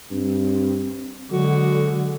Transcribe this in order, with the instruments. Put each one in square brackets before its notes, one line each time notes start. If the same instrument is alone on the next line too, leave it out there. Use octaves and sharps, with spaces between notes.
[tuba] G2 [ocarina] C4
[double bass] D3 G#3 [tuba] F#3 [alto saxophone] F#4 [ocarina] A4